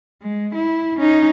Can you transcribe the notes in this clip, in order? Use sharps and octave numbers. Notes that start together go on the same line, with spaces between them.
G#3
E4
C#4 D#4